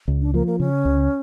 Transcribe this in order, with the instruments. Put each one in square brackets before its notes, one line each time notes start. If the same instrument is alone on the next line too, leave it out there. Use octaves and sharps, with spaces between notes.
[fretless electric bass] C#2
[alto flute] D4
[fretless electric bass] F3 [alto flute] A#3
[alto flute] A#3
[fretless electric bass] C#3 [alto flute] C#4
[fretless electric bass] C#2